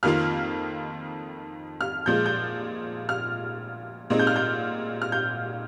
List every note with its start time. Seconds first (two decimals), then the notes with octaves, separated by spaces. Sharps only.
0.03 F2 D#3 A#3 F4 F6
1.81 F6
2.06 A#2 F3 G#3 G6
2.26 G6
3.09 F6
4.10 A#2 G#3 C4 D#4
4.19 G6
4.27 F6
4.36 G6
5.02 F6
5.12 G6